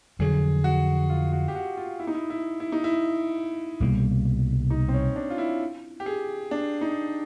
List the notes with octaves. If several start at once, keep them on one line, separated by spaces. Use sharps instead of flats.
F2 D3 F#3 G#4
F#4
F4
F#4
G4
F#4
F4
E4
D#4
E4
E4
E4
D#4
E4
C2 B2 G3 A#3
D#4
C4
C#4
D4
F4
E4
G4
G#4
D4
D#4